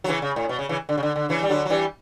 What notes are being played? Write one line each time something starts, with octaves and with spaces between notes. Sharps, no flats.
F#3
C#3 E3
C#3
A2
B2
C#3
C#3 E3
D3
C#3
D3
D3
C#3 E3
G3
D3 F#3
F#3
E3 G3